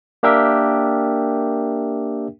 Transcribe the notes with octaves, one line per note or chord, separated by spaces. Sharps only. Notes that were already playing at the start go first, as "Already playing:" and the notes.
A#3 D4 G4 A#4 E5 G5